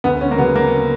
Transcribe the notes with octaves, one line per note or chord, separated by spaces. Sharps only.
D2 B3
C#4
A#3
C#3 F#3 B3
A#3